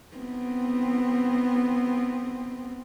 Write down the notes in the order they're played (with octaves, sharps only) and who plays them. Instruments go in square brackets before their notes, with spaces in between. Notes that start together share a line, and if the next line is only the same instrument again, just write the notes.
[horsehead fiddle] B3 C4